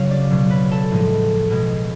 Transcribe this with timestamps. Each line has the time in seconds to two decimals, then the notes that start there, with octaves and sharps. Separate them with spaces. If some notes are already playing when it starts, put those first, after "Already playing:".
Already playing: C#3 F#3 F5
0.11 D5
0.31 B2 F#3
0.50 B4
0.71 A4
0.91 A2 F3 G#3
1.51 B2 G#3